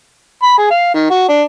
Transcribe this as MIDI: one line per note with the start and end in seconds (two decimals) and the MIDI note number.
0.43 0.57 83
0.58 0.69 68
0.70 0.93 77
0.94 1.09 51
1.11 1.27 66
1.29 1.43 62